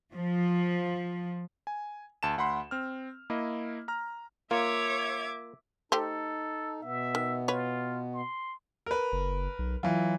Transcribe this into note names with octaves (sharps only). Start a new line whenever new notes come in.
F3
G#5
D2 A5 E7
D2 F#5 B5 C6
C4 F6
A#3 E4 D#5
A#5 F6
A#3 F4 C#5 E5 D6 G#6
A3 D#4 G4 A4 C5
B2 B3 E5
D#3
F4 B4 C#5
C6
A#4 B4
F#1
B1
E3 F#3 F4